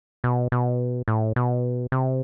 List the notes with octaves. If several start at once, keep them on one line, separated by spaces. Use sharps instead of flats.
B2
B2
A2
B2
C3